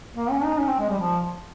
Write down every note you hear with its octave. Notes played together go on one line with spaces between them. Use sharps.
A#3
C#4
D#4
C#4
C4
G#3
G3
F3